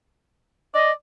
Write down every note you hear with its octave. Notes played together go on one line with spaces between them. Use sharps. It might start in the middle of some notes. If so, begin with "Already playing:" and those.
D5 D#5